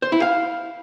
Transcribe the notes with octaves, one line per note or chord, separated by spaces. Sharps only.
C5
E4
F5